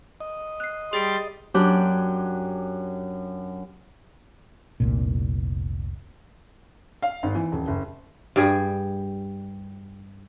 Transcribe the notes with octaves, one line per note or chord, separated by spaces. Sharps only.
D#5
F#6 C7
G3 G#4 C6 A6 D7
F#2 F#3 D4 G4
F1 C2 A#2
F5
G#1
E3
D#1
F#1
G2 G3 G4 G#4